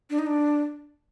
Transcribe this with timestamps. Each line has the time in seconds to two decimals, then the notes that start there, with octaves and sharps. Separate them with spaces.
0.10 D4
0.19 D#4
0.27 D4